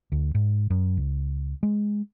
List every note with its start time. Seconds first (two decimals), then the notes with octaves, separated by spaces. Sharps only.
0.12 D2
0.35 G#2
0.70 F#2
0.97 C#2
1.63 G#3